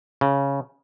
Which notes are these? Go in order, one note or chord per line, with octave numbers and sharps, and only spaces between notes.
C#3